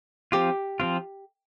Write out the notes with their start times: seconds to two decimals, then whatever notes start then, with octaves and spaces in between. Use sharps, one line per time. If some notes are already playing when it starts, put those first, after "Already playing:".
0.32 F3 C4 F4 G4
0.80 F3 C4 F4